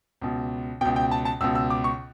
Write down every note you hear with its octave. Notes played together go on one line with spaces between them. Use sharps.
C#2 B2
C#2 B2 G5
G5
A5
A5
C#2 B2 E6
E6
D6
C#6